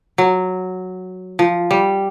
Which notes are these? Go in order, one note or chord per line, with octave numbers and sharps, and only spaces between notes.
F#3
F3
G3